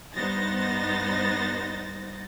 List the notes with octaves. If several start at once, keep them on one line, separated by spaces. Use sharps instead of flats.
G2 B3 D#4 C5 A6 A#6